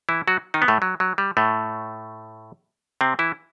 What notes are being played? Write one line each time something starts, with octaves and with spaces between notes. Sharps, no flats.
E3 E4
F#3 F#4
D#3 D#4
B3
A2 A3
F#3
F#3
G3
A2 A3
C3 C4
E3 E4